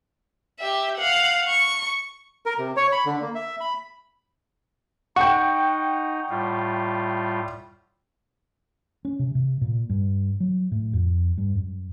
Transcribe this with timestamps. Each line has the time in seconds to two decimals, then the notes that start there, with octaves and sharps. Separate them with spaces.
0.59 G4 E5
0.98 F5 F#5
1.48 C#6
2.46 A#4
2.58 C3
2.77 C#5
2.92 B5
3.06 D3
3.21 A#3
3.35 E5
3.60 B5
5.16 D#4 F#5 G5 C#6
6.30 A2 G3 F4
9.05 C#4
9.19 C3
9.35 C3
9.61 A#2
9.90 G2
10.40 F#3
10.72 A2
10.93 F2
11.38 G2
11.55 F#2